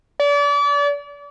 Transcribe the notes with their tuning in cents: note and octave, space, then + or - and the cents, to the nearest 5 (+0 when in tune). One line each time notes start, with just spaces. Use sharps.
D5 -35